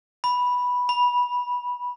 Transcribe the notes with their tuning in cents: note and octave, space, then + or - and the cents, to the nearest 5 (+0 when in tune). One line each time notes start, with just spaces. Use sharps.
B5 -5
B5 -15